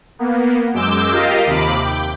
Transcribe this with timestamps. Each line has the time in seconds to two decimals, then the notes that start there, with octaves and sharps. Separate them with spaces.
0.19 A#3 B3
0.74 F#2 G#3 D6 E6 G6
1.12 F4 G4 A#4 D#5 F5
1.46 D#2 C3 B5 D6
1.83 G5